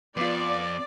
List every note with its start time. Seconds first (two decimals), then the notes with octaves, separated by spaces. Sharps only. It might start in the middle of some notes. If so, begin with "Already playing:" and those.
0.17 F2 B3 F4 D5 D6